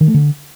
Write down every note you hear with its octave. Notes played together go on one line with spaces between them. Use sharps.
D#3
A3
D3